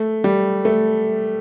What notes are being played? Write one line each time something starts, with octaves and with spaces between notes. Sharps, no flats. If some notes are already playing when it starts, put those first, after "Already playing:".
Already playing: A3
G3
A3